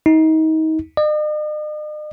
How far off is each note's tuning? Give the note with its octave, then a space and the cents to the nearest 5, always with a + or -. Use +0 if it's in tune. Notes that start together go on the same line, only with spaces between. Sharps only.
D#4 +30
D#5 -45